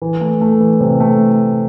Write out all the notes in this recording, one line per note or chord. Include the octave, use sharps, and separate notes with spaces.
E3
A3
A3
E3
C3
A3